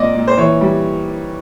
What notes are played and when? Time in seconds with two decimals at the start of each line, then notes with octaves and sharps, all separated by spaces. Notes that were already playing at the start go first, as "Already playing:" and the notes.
Already playing: A#2 C4 D5 D#5
0.15 A#2
0.28 C5
0.37 E3 C#5
0.61 G3